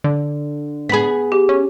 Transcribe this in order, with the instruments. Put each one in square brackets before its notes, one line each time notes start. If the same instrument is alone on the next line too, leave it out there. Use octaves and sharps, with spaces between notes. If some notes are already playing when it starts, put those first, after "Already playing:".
[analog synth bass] D3
[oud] B3 G#4 [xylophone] B5 B6
[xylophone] G4
[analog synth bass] C#4